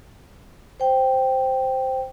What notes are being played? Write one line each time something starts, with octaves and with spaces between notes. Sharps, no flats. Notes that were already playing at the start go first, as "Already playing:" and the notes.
C5 G5